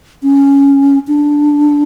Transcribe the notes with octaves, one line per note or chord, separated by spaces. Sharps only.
C#4
D4